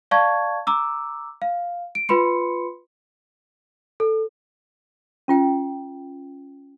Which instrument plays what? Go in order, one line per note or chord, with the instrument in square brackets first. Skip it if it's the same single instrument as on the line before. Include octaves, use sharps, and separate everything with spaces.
[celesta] D5 F5 A5 C#6 G#6
A#5 D6 E6
F5
D7
F4 B4 B5 C6 C#7
A4
[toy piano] C#4 F4 G5